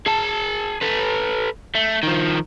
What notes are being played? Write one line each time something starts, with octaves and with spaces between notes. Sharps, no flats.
G#4 A5
A4 B4
A3
D#3 F3